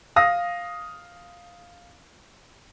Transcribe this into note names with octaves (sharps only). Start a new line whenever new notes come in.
F5 D#6 A#6